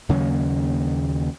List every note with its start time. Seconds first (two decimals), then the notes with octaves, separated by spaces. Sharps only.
0.09 D#2 C#3 F#3 A#3